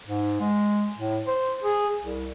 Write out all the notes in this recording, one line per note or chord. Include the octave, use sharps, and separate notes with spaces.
G#2
G#3
A2
C5
G#4
C2